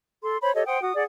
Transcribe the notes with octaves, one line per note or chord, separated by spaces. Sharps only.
A4 C6
C5 C#5 B5
G4 A4 C#5 D#5
C5 F#5 G5 D#6
F#4 F#5 D#6
G#4 D5 F#5